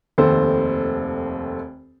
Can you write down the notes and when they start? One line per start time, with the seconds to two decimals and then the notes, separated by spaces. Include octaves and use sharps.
0.18 F1 D#2 A4 C5